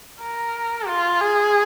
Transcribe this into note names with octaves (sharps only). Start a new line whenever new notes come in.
A#4
F4
G#4